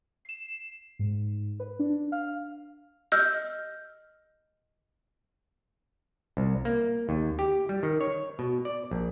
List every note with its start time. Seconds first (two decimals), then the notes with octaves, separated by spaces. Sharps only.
0.25 C7 E7
0.99 G#2
1.60 B4
1.79 D4
2.12 F5 F6
3.12 D#5 E6 F6 G6
6.37 C2
6.65 A#3
7.09 D#2
7.39 G4
7.69 G3
7.83 D#3
8.01 C#5
8.39 B2
8.65 D5
8.91 A#1